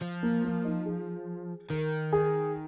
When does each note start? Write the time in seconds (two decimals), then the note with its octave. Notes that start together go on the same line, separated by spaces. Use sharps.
0.02 F3
0.23 A#3
0.45 A#3
0.65 D#4
0.86 G#4
1.70 D#3 A#4
2.13 G#4